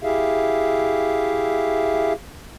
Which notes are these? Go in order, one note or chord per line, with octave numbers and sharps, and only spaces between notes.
E4 G4 G#4 E5 F5